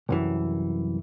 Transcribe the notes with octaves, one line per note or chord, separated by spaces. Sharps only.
C2 F#2 E3